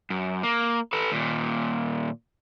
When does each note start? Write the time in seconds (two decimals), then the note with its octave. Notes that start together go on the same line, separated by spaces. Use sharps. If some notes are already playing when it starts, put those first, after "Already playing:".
0.10 F#2
0.43 A#3
0.93 A4 B4
1.12 D#2 A#2